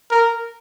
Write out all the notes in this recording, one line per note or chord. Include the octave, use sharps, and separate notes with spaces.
A#4